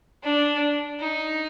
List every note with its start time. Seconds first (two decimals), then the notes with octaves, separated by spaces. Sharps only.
0.23 D4
1.00 D#4